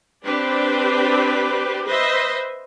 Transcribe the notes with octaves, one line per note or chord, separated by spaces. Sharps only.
C4 D4 G4 B4 C5 D5
B4 C5 D#5 E5